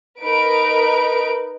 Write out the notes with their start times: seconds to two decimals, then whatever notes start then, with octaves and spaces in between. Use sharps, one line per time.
0.22 D#4 A#4 B4 D7